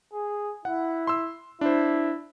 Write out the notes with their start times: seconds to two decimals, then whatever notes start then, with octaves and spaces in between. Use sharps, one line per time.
0.13 G#4
0.65 E4 F#5
1.07 C6 E6
1.61 D4 E4 C5